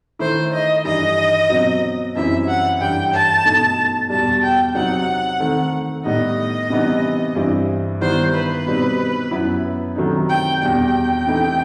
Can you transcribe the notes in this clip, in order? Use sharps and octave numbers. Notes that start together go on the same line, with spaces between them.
D#3 A3 E4 C5
D#5
G2 E3 G3 D#4 D#5
B2 F#3 C4
F#2 E3 G3 C4 E4 E5
F#5
G2 E3 G3 G5
A5
B2 A3 D#4
E2 B2 G3 A5
G5
C3 F#3 C4 D#4 F#5
D#3 A3 C4
A2 G3 B3 D#4 D#5
C3 E3 G3 B3 D#4
G2 E3 G3 C4 E4
D#3 G3 B3 E4 C5
B4
B2 G3 C4 D#4
F#2 F#3 B3 E4
C3 D#3 F#3 A3 D#4
G5
E2 B2 G3 G5
C3 E3 A3 D#4